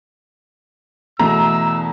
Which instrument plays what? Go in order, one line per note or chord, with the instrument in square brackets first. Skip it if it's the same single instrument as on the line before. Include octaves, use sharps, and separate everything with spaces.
[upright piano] E2 B2 [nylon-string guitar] A3 [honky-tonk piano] A#5 [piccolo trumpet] E6